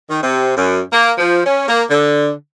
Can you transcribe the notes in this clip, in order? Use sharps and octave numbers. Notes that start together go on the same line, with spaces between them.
D#3
C3
F#2
A#3
F3
C#4
A#3
D3